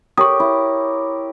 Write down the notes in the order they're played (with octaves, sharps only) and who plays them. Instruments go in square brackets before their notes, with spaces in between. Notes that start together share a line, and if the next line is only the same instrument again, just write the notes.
[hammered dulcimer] G4 A#4 C#5 [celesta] C#6 D#6
[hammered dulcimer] E4